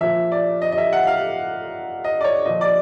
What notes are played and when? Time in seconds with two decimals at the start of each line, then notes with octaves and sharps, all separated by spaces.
0.01 A#2 F3 E5
0.32 D5
0.62 D#5
0.72 D#5
0.78 E5
0.93 F#5
1.07 F5
2.04 D#5
2.21 D5
2.24 C#5
2.45 A#2 F3 D#5
2.61 D5